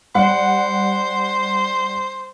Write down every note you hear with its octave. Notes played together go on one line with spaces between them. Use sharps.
G3 C5 F#5